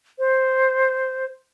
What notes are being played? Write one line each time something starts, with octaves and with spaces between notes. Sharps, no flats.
C5